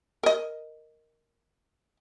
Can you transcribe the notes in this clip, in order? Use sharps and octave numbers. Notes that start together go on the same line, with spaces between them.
A#4 D#5